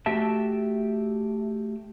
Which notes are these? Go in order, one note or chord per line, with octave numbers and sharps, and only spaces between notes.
A3 F#4 G4 E5 G5 A5